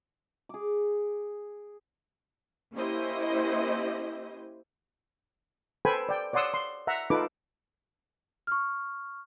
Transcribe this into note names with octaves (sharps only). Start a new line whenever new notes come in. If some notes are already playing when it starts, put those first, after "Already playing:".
G#4 D6
A#3 C#4 E4 G4 C5 D#5
A4 B4 C5 G5 G#5 B5
D5 G5
C#5 D5 F#5 C6 D#6 E6
C6
E5 F#5 A#5
D#4 F4 A4 B4 D6
C#6 F6